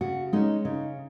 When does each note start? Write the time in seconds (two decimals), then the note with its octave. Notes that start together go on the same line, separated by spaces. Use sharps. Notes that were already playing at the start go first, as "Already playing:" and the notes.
0.01 C#3 F#4
0.33 G#3 C#4 D#4
0.65 C#3 D#4